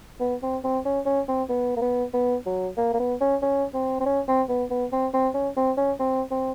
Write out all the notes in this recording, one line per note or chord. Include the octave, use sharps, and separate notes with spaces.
B3
C4
C4
C#4
C#4
C4
B3
A#3
B3
B3
F#3
A#3
A#3
B3
C#4
C#4
C4
C4
C#4
C4
B3
B3
C4
C4
C#4
C4
C#4
C4
C4